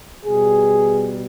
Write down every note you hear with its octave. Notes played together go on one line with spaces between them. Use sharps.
B2 G3 B3 G#4